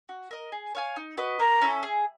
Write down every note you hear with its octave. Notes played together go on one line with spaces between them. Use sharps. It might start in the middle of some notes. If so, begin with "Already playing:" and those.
F#4
A#4 D#5
G#4
C#5 F5 G#5
D#4
F#4 B4 D#5
A#3 A#5
C#4 E4 A4
G#4